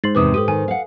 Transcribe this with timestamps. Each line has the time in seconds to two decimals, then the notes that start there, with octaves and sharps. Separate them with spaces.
0.04 G#2 C5 A6 C7 F#7
0.15 E2 C3 D#3 B4 D6 D#6
0.34 G4 A4 D#6 D#7
0.48 D#3 G#5
0.68 F5 F#5